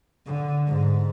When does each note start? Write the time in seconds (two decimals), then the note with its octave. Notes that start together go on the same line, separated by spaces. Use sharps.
0.26 D3
0.67 G#2